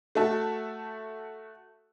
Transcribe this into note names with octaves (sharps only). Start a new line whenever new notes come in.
A3 F#4 E5 A5